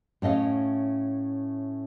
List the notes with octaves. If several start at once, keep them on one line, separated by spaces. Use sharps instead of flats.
A2 C#4 D#5 F5